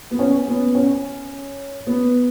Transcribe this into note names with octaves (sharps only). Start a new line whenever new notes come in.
B3
C#4
B3
C#4
B3